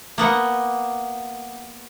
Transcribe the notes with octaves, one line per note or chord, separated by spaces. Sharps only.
A#3 B3 F#5